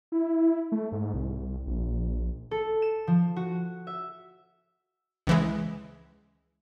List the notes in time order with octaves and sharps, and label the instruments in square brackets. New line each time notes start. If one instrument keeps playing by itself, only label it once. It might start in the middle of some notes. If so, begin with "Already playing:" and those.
[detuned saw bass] E4
A3
G#2
C2
A#1
[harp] A4
E7
F3
F#4
E5
[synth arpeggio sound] C#2 E3 G#3